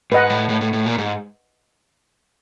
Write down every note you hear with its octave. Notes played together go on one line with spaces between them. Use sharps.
G#2 B4 D#5 F#5
A2
A2
A2
A2
A#2
G#2